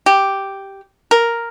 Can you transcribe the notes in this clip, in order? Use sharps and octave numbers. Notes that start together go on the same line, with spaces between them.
G4
A#4